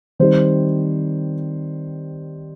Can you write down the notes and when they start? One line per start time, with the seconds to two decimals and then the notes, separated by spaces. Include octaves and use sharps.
0.19 D#3 G3 C4 C5